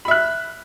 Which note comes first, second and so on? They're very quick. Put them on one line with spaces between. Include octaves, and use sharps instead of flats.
B5 E5 F#6